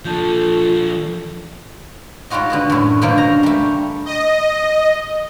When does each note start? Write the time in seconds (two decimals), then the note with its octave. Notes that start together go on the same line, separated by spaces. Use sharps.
0.05 F3 D4 F4 A4 A5 G6
2.30 G#2 G3 F4 F#4 D#5
2.50 D3 B3 F#4
2.70 F#2 A2
3.01 F#2 B2 D3 A#3 F4 C5
3.18 A#5
3.43 G3 A3
4.06 D#5